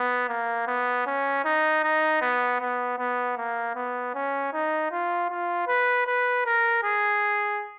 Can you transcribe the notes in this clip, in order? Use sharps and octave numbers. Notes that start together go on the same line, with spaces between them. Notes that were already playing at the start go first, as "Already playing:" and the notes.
Already playing: B3
A#3
B3
C#4
D#4
D#4
B3
B3
B3
A#3
B3
C#4
D#4
F4
F4
B4
B4
A#4
G#4